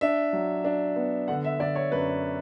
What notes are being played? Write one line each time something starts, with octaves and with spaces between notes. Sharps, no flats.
D4 E5
F#3
D4
B3
D3 F#5
E5
D3 D5
C#5
F#2 B4